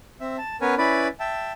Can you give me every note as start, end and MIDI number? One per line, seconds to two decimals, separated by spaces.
0.21 0.37 60
0.21 0.37 76
0.38 0.56 81
0.61 0.75 59
0.61 0.75 61
0.61 0.75 70
0.61 0.75 71
0.61 0.75 73
0.61 0.75 80
0.78 1.08 61
0.78 1.08 64
0.78 1.08 71
0.78 1.08 74
0.78 1.08 83
1.20 1.52 76
1.20 1.52 79
1.20 1.52 81